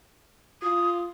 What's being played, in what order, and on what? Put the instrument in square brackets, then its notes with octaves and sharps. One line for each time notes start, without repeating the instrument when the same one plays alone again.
[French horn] F4 [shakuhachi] D#6